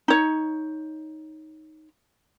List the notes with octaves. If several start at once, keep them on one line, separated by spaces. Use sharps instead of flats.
D#4 C#5